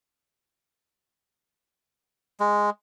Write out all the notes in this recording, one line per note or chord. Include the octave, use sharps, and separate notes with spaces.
G#3